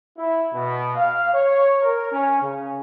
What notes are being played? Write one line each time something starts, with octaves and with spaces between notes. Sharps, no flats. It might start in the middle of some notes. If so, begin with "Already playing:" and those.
E4
B2
F5
C#5
A#4
C#4
C#3